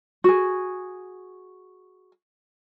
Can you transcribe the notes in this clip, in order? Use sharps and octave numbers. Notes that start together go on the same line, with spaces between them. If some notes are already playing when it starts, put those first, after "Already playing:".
F#4 G#4